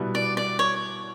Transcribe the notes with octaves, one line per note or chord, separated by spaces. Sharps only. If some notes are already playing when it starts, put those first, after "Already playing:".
Already playing: B2 G3 B3 E4
D5
D5
C#5